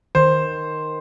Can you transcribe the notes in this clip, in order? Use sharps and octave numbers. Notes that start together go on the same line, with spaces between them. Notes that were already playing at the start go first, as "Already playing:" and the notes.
D#3 C5